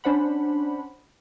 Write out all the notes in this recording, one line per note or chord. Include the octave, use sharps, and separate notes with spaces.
C#4 D4 C5 F#5 B5